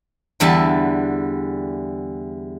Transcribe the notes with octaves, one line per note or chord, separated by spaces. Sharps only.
E2 D3 G3 B4 E5 A5